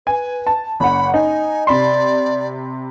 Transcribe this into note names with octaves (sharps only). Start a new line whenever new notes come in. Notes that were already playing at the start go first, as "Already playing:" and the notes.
B4 G#5
A5
F#1 F#5 B5
D#4 G#5
C3 D5 B5 C6